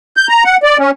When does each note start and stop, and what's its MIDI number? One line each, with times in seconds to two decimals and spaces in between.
0.17 0.27 91
0.29 0.43 82
0.44 0.57 78
0.63 0.78 74
0.79 0.91 61